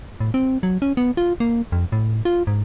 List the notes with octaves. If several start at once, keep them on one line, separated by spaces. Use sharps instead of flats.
A2
C4
F#3
C#4
B3
F4
A#3
F2
A2
F4
G#2